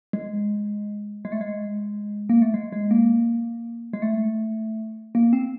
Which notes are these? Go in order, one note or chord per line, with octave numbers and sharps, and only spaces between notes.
G#3
G#3
A3
G#3
A#3
A3
G#3
G#3
A#3
G#3
A3
A#3
C4